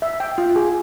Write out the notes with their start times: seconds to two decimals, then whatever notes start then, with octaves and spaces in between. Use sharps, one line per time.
0.02 E5
0.20 G5
0.38 F4
0.56 G#4